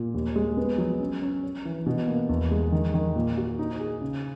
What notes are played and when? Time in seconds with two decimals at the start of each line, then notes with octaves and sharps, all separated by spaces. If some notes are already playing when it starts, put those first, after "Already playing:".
Already playing: A#2
0.14 D#2
0.36 G#3
0.57 B3
0.78 F#3
1.00 C#4
1.22 C#4
1.43 C#4
1.65 E3
1.86 B2
2.08 A#3
2.29 E2
2.51 G#3
2.72 D#3
2.94 D#3
3.16 A#2
3.37 F#4
3.59 D#4
3.80 G#4
4.01 C#3